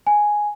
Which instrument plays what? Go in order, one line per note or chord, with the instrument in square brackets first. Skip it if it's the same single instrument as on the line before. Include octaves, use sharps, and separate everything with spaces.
[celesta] G#5